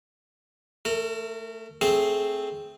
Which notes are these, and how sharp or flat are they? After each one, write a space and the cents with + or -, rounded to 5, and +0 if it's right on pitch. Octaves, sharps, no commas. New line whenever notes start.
A3 +10 A#4 -30
A3 +0 C4 +0 G#4 +10